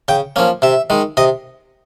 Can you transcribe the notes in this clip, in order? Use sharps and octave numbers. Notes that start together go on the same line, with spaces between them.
C#3 G5
F3 A#3 C#4
C3 E5
D#3 G#3
C3 D#5